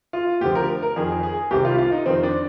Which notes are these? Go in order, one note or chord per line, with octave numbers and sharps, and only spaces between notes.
F4
D2 D3 F3 G4
A#4
A#4
F2 D#3 G#4
G#4
C2 C3 D#3 G4
F4
F4
D#4
F2 D#3 C4
D4